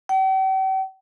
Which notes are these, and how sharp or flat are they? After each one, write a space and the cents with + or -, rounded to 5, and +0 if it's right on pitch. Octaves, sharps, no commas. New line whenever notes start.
G5 -45